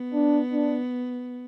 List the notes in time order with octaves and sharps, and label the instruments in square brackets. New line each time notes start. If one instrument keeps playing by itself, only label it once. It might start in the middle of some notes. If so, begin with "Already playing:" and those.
Already playing: [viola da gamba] B3
[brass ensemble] D4
D4